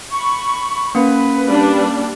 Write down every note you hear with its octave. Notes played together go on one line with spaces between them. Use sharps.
B5 C#6
A#3 C#4 B4 F#5
G3 D4